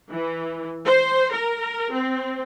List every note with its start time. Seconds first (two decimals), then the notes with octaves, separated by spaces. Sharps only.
0.11 E3
0.85 C5
1.32 A#4
1.92 C4